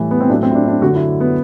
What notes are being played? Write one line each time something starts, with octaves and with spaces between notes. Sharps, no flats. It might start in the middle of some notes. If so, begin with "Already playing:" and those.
Already playing: A2 E3 G3
B3
C4
A2 F#3 D4
C4
E4
D4
D4
F#2 D3 F#3 F#4
E4
B3